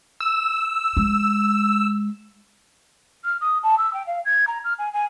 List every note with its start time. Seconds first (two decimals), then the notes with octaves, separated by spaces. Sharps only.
0.20 E6
0.97 G#3
3.24 F6
3.41 D#6
3.63 A5
3.78 E6
3.94 G5
4.07 F5
4.25 G#6
4.47 A#5
4.64 F6
4.79 G#5
4.93 G#5